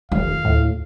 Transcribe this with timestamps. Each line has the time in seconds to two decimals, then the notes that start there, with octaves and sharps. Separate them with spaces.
0.12 F1 D#3 F4 F5
0.45 D2 A2